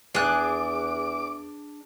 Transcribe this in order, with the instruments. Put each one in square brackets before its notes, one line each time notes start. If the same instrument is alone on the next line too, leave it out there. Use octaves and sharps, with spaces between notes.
[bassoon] E2 [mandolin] D4 F#6 [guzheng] G#4 [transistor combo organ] D6